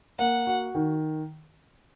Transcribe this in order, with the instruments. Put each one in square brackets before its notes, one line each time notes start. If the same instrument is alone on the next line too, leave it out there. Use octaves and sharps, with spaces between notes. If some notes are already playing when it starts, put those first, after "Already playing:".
[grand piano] A#3 [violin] F#5
[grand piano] F#4
D#3